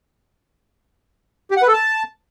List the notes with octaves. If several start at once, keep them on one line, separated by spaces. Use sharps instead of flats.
G4
F#5
B4
A4
A5